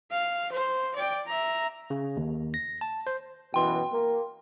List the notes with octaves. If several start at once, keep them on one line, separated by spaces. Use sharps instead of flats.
F5
C5
D5 G5
E5 A#5
C#3
D#2
A#6
A5
C5
F#2 B2 E3 G5 C6
A#3